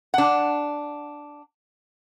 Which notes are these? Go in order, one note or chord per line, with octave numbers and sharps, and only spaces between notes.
D4 F#5